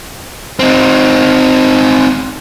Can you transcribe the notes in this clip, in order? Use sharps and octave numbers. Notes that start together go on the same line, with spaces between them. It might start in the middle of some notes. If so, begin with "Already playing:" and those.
C4 D#4